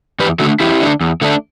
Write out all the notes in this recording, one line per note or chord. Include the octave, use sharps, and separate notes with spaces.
E2 G4 B4
D3 A3 D4 F#4 A4
E2 E4 G4
D3 A3 D4
E2
D3 A3 D4